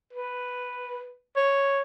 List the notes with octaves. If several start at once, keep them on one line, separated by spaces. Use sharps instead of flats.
B4
C#5